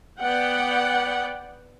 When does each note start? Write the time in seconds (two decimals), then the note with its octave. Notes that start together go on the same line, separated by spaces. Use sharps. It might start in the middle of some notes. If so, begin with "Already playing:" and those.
0.21 B3 D5 F#5 G5